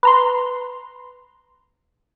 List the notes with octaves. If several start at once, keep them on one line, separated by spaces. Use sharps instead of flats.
B4 A#5 C6